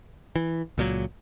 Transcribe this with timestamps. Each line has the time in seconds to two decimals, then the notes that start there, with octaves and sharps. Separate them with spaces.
0.36 E3
0.78 C#2 A#2 F#3